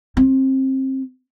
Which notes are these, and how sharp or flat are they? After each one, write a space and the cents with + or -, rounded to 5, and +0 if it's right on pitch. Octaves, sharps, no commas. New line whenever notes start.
C4 +25